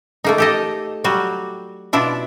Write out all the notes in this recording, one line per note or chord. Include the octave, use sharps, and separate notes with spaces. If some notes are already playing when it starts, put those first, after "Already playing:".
A3 A#3 D#4
G4 A4 D#5
F#3 G3 F#4
B2 D4 E4 F4